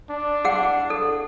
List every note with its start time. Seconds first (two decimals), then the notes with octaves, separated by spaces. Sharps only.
0.10 D4
0.45 G#4 F#5
0.90 A4